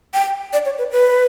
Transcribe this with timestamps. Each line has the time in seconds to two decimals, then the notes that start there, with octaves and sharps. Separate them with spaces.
0.14 G5
0.53 D5
0.65 C#5
0.79 B4
0.91 B4